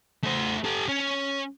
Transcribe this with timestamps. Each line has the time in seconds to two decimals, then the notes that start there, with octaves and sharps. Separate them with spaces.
0.24 A3 C5
0.64 G4 A4
0.89 C#4